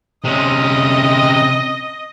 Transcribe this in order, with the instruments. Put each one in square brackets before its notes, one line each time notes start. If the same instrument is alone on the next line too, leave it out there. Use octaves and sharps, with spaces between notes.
[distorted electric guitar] C3 C#4 [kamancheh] D#5